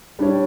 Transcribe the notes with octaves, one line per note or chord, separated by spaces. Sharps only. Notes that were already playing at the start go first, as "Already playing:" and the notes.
G3 D4 G4 C#5